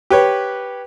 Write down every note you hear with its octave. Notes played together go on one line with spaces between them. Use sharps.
G4 B4 C#5